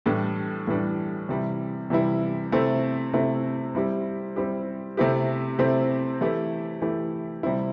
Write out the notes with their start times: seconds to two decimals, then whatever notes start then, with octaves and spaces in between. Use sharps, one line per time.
0.06 A2 E3 G3 D4
0.67 A2 E3 G3 D4
1.29 C3 E3 G3 E4
1.90 C3 E3 G3 E4
2.52 C3 A3 C4 E4
3.13 C3 A3 C4 E4
3.75 G3 C4 E4 G4
4.36 G3 C4 E4 G4
4.97 C3 A3 C4 E4 G4
5.59 C3 A3 C4 E4 G4
6.21 E3 A3 E4 G4
6.82 E3 A3 E4 G4
7.43 C3 G3 C4 E4